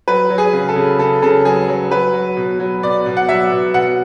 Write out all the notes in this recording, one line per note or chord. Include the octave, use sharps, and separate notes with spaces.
F#3 B4
F#3
G#4
C#3
A4
C#3
C#3 A4
C#3 A4
F#3 G#4
F#3
F#3 B4
F#3
B2
F#3
B2 D5
B2
F#5
F#3 E5
B2
B2 F#5